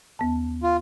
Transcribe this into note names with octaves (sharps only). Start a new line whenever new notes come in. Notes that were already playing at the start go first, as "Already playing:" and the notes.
D#2 B3 A5
F4